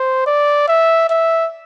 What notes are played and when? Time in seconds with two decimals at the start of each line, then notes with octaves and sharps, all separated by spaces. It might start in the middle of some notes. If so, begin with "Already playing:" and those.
Already playing: C5
0.26 D5
0.68 E5
1.09 E5